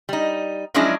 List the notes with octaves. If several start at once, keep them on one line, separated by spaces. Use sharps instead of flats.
G3 D#4
F3 F#3 G#3 C#4 D4 E4